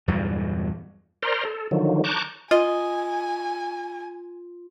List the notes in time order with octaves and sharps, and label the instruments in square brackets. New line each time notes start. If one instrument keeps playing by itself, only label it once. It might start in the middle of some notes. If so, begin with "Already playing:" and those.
[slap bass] E2 G2 A#2 F#3
[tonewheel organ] A#4 C5 D5 A#5 C6
A4
D3 D#3 F3 F#3
A5 A#5 C#6 D6 F#6 G6
[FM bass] F4 [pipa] D#5 [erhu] G#5